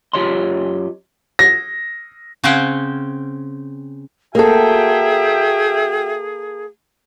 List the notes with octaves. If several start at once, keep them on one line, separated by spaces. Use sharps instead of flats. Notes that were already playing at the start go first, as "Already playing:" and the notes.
F#2 F4 G4 C#5 D#5 C6
A#6
C#3 C4 C#4 C5 F#5 G5
A#3 F#4 G#4 A4 E5 G5